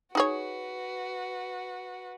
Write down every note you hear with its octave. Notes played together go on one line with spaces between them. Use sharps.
D#4 F#4 G#4 B4 C#5